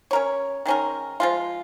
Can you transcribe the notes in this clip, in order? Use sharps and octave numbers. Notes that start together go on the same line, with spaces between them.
C#4 A#4 C#5
D#3 G#3 C#4 A#4
F3 G#3 F4